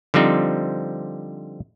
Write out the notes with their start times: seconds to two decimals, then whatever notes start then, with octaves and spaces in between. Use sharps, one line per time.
0.14 D3 F3 G3 C4 D#4